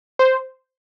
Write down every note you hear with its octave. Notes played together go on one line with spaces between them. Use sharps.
C5